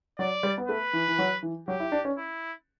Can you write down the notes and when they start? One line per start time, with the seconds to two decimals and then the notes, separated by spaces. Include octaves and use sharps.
0.18 F#3 D5
0.43 G3
0.58 B3
0.68 A3 B4
0.93 E3
1.08 E3
1.19 F#3
1.43 E3
1.68 F#3 G4
1.80 E4
1.92 D4
2.05 C#4
2.17 E4